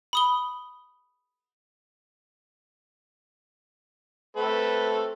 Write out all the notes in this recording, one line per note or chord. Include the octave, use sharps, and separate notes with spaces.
B5 D#6 G7
A3 C4 A4 B4